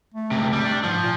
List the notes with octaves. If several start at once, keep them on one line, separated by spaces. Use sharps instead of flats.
A3
C#2 C3
G3
D4
G#2 F3
A#2